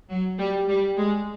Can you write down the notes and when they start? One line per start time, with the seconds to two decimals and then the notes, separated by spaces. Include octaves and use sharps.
0.10 F#3
0.39 G3
0.69 G3
0.98 G#3